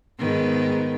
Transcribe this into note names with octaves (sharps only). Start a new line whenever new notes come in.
G#2 D#3 B3